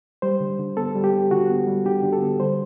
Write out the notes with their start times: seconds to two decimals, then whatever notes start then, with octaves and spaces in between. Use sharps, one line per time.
0.22 G3 C5
0.41 D3
0.59 D3
0.77 B3 A4
0.95 G3
1.04 G4
1.13 D3
1.31 D3 F#4
1.50 B3
1.67 G3
1.86 D3 G4
2.04 D3
2.13 A4
2.22 B3
2.40 G3 C5